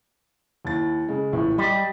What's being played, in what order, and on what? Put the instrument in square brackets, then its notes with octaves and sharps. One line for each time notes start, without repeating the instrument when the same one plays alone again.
[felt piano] D#2 E4 A6
C#3 G#3
A#1 A2 E3
[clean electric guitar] G3 [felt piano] D#5 G5